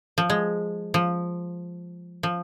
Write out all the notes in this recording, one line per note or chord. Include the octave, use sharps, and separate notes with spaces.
F3
G#3
F3
F3